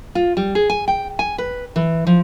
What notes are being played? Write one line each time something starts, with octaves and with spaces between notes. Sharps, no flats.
F4
G3
G#4
G#5
G5
G#5
B4
E3
F3